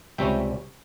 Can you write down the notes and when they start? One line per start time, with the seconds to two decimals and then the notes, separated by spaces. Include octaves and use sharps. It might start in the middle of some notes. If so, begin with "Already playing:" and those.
0.18 C#2 C3 G3 C#4 E5 G5